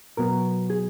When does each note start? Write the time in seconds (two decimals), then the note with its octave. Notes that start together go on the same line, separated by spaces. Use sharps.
0.17 B2 F#3 B3 A#4
0.70 G#4